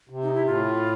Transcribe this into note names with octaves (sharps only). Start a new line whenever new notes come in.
C3
D#4
E4
A2 F4